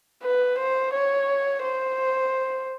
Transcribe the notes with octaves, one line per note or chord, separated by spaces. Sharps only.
B4
C5
C#5
C5